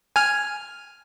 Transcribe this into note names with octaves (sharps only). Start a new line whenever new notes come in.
G#5 F6